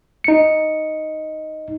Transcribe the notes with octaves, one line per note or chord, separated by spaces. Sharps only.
D#4 C#7